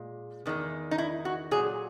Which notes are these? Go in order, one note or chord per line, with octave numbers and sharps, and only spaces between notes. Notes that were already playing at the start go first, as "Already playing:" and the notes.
Already playing: A#2 G#3
E2 D#3 G#3
D#4
E4
F#4
A#2 F#3 G#4